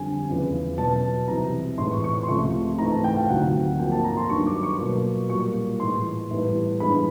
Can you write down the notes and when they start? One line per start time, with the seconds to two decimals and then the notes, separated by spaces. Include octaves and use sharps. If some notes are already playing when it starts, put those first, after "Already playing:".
Already playing: F2 D3 G3 G#5
0.27 E2 C#3 F3
0.78 B2 F#3 B3 A5
1.28 C2 C3 E3 A#5
1.78 A2 E3 G#3 C6
1.91 C#6
2.04 C#6
2.23 C6
2.28 C#2 C3 F3 A3 C#6
2.78 G#2 E3 A3 A#5
2.92 A5
3.04 G5
3.16 F5
3.29 D2 C3 D#3 F#3 F#5
3.79 G#2 F3 A#3 G5
3.92 A5
4.04 A#5
4.17 C6
4.29 G2 D#3 F#3 C#6
4.46 D6
4.63 C#6
4.79 B2 F#3 A#3
5.29 A#2 G3 A#3 C#6
5.80 A2 E3 G#3 C6
6.30 A2 E3 G3 B3
6.80 G2 E3 G#3 B3 B5